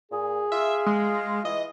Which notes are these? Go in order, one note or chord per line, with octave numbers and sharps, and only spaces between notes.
A#2 G#4
F4 E5
G#3
E3 D#5